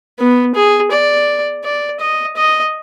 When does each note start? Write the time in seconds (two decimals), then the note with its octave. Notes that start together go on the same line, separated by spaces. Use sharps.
0.19 B3
0.55 G#4
0.91 D5
1.64 D5
2.00 D#5
2.37 D#5